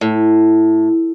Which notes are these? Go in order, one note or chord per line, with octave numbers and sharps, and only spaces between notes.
A2